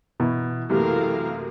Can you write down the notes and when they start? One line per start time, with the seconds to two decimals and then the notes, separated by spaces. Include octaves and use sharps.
0.20 B2 E3 E4
0.70 F#2 C3 E3 A3 A#3 G4 A#4 F5